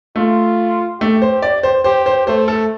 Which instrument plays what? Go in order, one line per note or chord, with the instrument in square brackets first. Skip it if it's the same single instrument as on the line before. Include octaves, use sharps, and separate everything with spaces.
[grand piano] A3 [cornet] F4
[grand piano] A3 [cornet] G4
[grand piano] C5
D5
C5
[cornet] G4 [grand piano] C5
[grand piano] C5
[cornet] A3 [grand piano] C5
[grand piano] A4